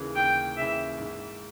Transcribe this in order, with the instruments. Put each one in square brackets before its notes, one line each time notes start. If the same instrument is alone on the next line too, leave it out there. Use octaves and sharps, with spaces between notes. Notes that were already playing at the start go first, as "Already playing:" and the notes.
Already playing: [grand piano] D#2 C#3 E3
[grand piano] D#2 [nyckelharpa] G5
[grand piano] C#3 E3 [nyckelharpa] E5
[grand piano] G#2